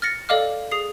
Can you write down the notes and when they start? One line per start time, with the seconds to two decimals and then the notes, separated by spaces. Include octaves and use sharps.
0.02 F6 A6 A#6 C#7
0.29 A4 D5 D#5 F5 D6 F6
0.71 G#4 D#6 C7